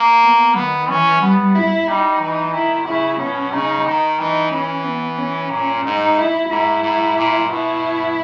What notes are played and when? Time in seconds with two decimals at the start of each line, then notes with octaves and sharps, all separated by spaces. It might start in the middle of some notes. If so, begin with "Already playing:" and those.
Already playing: A#3
0.22 B3
0.55 D#3 B3
0.88 E3 C#4
1.22 G3 B3
1.55 E4
1.87 G3 D#4
2.20 E3
2.53 D#3 E4
2.86 C#3 E4
3.19 B2 C#4
3.53 C#3 D#4
3.86 D#3
4.19 E3 D#4
4.52 E3 C#4
4.84 B3
5.17 C#4
5.51 A#2
5.84 G#2 D#4
6.17 E4
6.50 G#2 E4
6.83 G#2
7.17 A#2
7.49 B2 E4